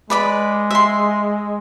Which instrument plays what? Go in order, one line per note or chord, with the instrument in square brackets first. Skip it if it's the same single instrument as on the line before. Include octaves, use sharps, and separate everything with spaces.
[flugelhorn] G#3 [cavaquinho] B4 D5 B5
[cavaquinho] E5 C6